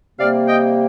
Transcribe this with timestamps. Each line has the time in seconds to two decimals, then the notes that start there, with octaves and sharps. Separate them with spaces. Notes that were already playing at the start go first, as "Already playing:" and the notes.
0.19 C3 G3 A#3 D5 F5
0.47 D#5 G5